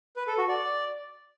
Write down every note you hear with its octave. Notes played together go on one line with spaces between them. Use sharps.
B4
A4
F#4
D5